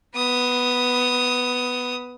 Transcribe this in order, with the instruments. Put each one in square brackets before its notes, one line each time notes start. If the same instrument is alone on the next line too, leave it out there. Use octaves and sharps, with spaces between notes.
[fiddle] B3 D#6